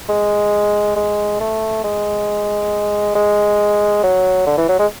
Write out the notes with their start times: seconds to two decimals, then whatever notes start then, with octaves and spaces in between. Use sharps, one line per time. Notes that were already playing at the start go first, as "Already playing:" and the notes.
0.09 G#3
0.96 G#3
1.40 A3
1.84 G#3
3.15 G#3
4.03 F#3
4.47 D3
4.58 E3
4.69 F#3
4.79 G#3